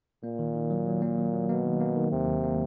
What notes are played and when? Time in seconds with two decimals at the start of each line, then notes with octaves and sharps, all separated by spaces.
0.24 A#2 A#3
0.39 D#3
0.55 D#3
0.70 F#3
0.86 F#3
1.02 A#3
1.18 F#3
1.34 F#3
1.49 B2 A#3
1.65 D#3
1.81 A#3
1.96 D#3
2.12 D#2 C3
2.28 D#2
2.44 A#3